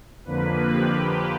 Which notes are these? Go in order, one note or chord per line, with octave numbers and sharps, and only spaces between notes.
F2 D3 F3 A#3 B4
G4